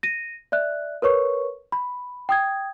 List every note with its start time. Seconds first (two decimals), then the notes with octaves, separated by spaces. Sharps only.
0.03 A#6 D#7
0.52 D5 E5 F#6
1.02 A#4 B4 C#5 C#6
1.72 B5
2.29 G5 D#6 G#6